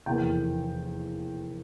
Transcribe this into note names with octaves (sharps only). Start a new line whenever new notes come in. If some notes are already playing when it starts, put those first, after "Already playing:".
F1 E2 E3 A#3 G5